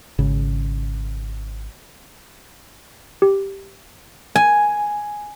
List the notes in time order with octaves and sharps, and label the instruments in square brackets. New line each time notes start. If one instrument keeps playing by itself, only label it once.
[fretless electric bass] G#1 C#3
[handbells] G4
[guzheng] G#5